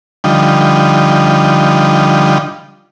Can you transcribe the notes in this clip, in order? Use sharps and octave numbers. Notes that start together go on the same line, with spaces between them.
D3 F3 G3 D#4